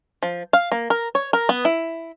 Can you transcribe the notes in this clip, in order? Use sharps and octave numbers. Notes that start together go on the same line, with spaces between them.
F3
F5
A#3
A#4
C#5
A#4
B3
E4